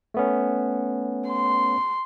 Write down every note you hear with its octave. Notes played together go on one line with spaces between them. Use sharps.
A3 B3 C#4
C6